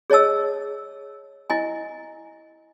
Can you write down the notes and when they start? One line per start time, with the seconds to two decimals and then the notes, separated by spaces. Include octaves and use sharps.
0.10 G#4 C#5 D#5 A5 E6
1.50 E4 D#5 G#5